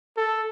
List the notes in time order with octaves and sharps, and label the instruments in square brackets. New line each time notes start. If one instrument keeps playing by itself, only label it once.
[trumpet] A4